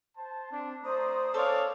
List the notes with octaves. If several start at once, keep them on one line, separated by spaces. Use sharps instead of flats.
C5 A5
C4 D4
A3 C5 D5 A#5 D#6
C#4 A4 C#5 D5 F5